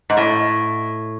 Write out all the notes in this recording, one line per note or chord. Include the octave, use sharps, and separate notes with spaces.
G#2
A2